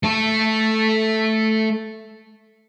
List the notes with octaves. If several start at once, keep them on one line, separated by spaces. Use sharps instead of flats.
A3 A4